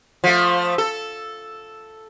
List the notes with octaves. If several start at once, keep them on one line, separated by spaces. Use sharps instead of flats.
F3 A3
A4